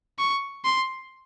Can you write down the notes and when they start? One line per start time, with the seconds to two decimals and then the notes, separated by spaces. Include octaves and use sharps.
0.18 C#6
0.65 C6